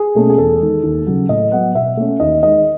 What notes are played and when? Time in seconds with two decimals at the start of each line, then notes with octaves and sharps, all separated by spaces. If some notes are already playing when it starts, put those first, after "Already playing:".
Already playing: G#4
0.15 B2 A3 C#4
0.30 G#4
0.38 E2 A4
0.60 D#3 G#3
0.83 D#2
1.07 C#3 F#3
1.29 A2 D#5
1.52 F#3 B3 F#5
1.74 B2 E5
1.97 A3 C#4
2.20 D#2 D#5
2.43 D#3 G#3 D#5